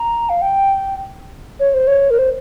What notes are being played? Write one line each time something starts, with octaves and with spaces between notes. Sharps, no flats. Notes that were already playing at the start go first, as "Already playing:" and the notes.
Already playing: A#5
F5
G5
C#5
C5
C#5
A#4
C5